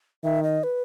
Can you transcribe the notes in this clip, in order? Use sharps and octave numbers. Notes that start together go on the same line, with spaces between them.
D#3 E5
D#5
B4